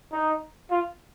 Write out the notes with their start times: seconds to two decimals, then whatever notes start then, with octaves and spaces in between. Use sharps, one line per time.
0.12 D#4
0.71 F4